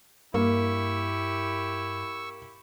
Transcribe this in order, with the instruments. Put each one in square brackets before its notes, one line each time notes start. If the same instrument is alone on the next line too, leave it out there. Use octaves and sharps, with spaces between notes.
[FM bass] G2 [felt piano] A#3 [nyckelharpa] E4 G4 [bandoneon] C#6 E6